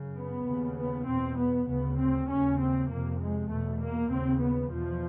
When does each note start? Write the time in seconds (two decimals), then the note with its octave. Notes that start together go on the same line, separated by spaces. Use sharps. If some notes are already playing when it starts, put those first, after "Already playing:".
Already playing: F#2 C#3
0.16 B3
0.46 D#2 C#3
0.77 B3
1.08 E2 B2 C4
1.38 B3
1.68 D2 C#3 B3
1.98 C4
2.28 D#2 C#3 C#4
2.60 C4
2.90 F2 C3 A#3
3.21 G#3
3.50 E2 B2 A3
3.81 A#3
4.11 D#2 C#3 C4
4.42 B3
4.72 E2 B2 F3